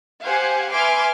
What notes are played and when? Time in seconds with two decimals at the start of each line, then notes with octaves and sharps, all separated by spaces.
0.23 G4 C5 F5 F#5 G#5
0.72 B4 E5 G#5 C6 D6 F6